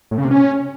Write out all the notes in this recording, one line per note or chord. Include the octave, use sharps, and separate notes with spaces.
A2
C#3
C3
C#4